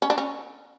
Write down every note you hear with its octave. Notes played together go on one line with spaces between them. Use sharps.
C#4
D4
C#4